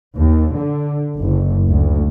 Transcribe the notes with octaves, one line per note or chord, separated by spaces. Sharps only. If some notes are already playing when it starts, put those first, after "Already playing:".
D#2
D3
F#1
D2